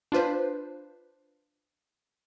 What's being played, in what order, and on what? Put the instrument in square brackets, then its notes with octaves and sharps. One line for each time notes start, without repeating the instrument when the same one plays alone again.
[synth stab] D4 F4 B4 C5